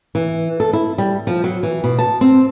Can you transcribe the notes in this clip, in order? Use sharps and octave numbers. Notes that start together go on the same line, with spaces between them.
E3
A4
E4
G3
F3
F#3
E3
B2
A5
C4